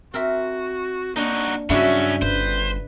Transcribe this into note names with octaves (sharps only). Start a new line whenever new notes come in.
C4 F#4 A#4 E5
A#3 D4 D#4 F#4
G2 C#3 F#3 C#4 D4 E4 F#4 E5
G1 B4 C5